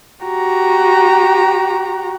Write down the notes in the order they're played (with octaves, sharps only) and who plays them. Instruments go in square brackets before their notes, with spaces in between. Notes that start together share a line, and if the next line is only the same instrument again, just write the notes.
[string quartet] F#4 G4 A#5